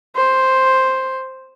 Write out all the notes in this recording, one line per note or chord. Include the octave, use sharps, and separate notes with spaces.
C5